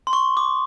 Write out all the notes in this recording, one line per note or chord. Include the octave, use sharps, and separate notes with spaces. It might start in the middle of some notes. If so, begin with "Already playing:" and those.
C6
C#6
D6